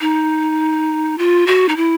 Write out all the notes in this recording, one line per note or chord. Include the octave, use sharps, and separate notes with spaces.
D#4
F4
F#4
D#4
E4